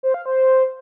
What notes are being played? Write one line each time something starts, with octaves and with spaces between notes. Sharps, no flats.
C5
F5
C5